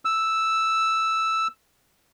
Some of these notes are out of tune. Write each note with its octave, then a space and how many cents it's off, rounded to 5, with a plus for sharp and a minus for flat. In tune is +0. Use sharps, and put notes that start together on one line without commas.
E6 +0